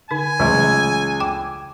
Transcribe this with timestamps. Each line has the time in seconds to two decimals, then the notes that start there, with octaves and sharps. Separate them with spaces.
0.11 D3 D#4 G#5
0.40 C#2 E3 F#3 A3
1.20 G5 D6